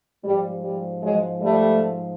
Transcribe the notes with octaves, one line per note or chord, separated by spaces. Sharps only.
G#2 F3 G3
G3
F#3 G#3
G3 A3